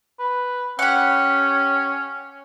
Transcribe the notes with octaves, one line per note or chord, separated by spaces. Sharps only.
B4
C#4 G4 F#5